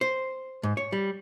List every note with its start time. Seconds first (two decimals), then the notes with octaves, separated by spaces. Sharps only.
0.01 C5
0.63 G#2
0.77 C#5
0.92 G3